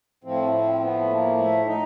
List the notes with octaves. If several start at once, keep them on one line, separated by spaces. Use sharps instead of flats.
A2 F3 C4
C4
B3
A3
A#3
A3
D#4